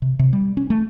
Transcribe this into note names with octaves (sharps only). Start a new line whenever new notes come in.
C3
C3
G3
C#4
A3